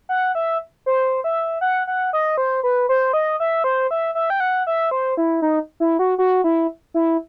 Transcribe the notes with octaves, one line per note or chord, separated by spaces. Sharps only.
F#5
E5
C5
E5
F#5
F#5
D#5
C5
B4
C5
D#5
E5
C5
E5
E5
G5
F#5
E5
C5
E4
D#4
E4
F#4
F#4
E4
E4